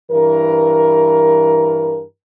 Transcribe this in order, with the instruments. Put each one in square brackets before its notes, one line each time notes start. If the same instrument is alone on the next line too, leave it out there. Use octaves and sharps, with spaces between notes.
[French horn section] G2 E3 A#4